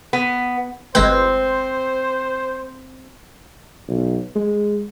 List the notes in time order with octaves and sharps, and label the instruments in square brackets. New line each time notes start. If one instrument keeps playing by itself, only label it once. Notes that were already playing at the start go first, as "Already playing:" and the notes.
[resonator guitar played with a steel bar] B3
[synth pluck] G1 G#3 B4 [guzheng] C4 [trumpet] C5
[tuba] B1
G#3